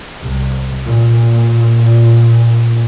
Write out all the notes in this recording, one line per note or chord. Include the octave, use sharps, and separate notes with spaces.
C2
A#2